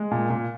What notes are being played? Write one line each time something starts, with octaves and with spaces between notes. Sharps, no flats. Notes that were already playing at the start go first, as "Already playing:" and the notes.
Already playing: G#3
A#2
A#2